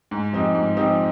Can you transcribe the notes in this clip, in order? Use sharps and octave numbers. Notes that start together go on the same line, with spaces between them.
G#2
F3 C4 D#4 G4
G#2
F3 C4 D#4 G4